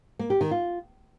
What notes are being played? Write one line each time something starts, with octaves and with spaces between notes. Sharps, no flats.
A#3
G4
D#3
F4